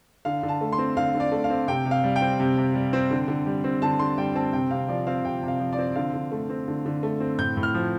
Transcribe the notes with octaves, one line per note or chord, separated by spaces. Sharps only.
D3 F5
D3
A5
A3
C6
C4
D3 F5
D3
D5
A3
F5
C4
C3 G5
C3
F5
G3
G5
C4
C3
C3
G3
C4
D3
D3
G3
C4
D3 A5
D3 C6
G3 G5
C4 A5
C3 G5
C3 F5
F3 D5
C4 F5
C3 G5
C3
F5
F3
D5
C4
D3 F5
D3
A3
C4
D3
D3
A3
C4
A2 G6
A2
F6
F3